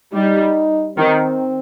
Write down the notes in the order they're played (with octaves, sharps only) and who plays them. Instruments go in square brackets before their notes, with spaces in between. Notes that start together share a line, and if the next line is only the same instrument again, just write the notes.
[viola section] G3 [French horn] D#4
[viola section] D#3 [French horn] C4